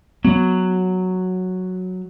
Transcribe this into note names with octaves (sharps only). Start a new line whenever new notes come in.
F#3 B3